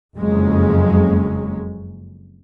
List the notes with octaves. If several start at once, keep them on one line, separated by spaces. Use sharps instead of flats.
F#1 F2 F#3 G#3 C#4